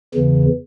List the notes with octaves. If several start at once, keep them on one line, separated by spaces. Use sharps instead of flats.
E2 C#3 E3